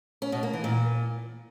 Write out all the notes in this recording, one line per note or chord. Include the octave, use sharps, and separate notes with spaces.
C#4
B2
A#3
E3
A#2